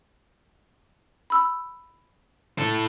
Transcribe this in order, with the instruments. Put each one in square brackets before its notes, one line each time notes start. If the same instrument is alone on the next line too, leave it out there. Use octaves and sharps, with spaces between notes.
[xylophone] B5 E6
[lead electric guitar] E4 A4